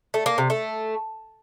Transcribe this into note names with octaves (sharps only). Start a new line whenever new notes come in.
A3
A#3
C3
A3